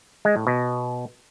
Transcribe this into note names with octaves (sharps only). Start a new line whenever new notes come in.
G#3
A2
B2